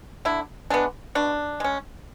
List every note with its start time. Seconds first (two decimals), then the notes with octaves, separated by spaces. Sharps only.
0.25 D3 E4
0.70 G#3 B3 D4
1.15 B2 D4
1.60 G#3 C#4